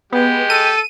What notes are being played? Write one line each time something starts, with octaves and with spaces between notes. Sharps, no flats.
G#3 B3 G4
A4 D#7